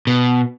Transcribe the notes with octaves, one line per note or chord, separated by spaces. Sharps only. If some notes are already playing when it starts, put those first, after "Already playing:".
B2